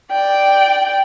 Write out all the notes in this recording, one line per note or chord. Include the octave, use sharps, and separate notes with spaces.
D5 G5